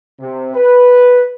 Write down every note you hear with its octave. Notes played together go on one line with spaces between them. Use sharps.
C3
B4